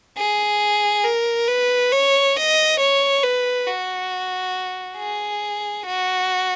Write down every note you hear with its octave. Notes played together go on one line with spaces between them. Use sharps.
G#4
A#4
B4
C#5
D#5
C#5
B4
F#4
G#4
F#4